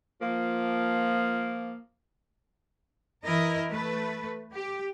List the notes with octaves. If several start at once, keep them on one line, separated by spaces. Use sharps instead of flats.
F3 A#3
E3 E4 A#4 D#5
A3 B4
G4